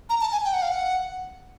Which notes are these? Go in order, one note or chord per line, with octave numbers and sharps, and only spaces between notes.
A#5
A5
G#5
G5
F#5
F5
F#5